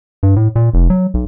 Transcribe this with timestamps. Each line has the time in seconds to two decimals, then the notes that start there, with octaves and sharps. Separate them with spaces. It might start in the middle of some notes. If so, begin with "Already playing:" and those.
0.23 G2
0.36 A2
0.56 A#2
0.74 F1
0.90 F#3
1.14 B1